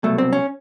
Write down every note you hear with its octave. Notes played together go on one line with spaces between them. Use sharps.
C2 B2 F#3 A3
C4
C#4